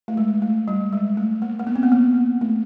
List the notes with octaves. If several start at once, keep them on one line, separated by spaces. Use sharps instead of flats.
A3
G#3
A3
G3
G#3
A3
A#3
A#3
B3
C4
B3
A#3
A3